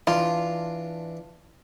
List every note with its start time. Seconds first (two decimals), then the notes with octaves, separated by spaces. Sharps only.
0.07 E3 D4 F4 D6